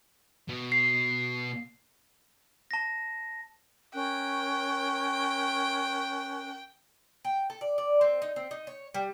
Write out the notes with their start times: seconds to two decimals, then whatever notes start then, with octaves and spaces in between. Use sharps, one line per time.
0.48 B2
0.72 C7
2.71 A5 A#6
3.95 C#4 A#4 G5 F#6
7.25 G5
7.50 A4
7.61 D5
7.78 D5
8.01 C4
8.22 D#4
8.36 C4
8.51 D#4
8.67 C#5
8.94 G3